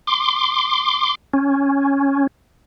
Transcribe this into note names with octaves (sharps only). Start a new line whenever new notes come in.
C6 D6
C#4